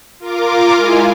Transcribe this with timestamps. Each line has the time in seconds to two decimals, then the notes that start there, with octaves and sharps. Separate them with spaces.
0.19 F4 A#4 D6
0.75 G#3 E4 F4 G#5